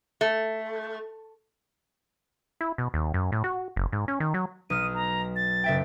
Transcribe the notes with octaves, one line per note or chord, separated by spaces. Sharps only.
A3
E4
B2
D#2
F#2
A2
F#4
F#1
G#2
C#4
D#3
F#3
B1 D#6 F6 D#7
A#5
A6
F#1 E5 G5